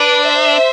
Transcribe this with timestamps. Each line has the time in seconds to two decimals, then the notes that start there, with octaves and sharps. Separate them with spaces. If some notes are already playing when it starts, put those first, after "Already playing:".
Already playing: D4 B4 D5
0.25 C5 E5